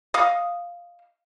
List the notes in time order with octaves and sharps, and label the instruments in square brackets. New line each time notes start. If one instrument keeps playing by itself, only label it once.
[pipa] D#5 F5